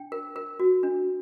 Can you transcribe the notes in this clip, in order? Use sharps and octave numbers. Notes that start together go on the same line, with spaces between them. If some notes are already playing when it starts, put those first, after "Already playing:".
Already playing: D4 G5
A#4
A#4
F#4
D4